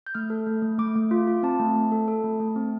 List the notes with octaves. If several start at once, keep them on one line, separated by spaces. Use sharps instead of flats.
G6
A3 F6
A4
A3
A3
A3 D6
A3
F4
F4
C4 A5
A3
A3
A4
A4
A3
A3
C4